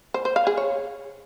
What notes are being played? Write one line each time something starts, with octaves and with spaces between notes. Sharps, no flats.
C5
C5
F5
G#4
C#5